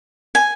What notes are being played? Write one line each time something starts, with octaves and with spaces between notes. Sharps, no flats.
G#5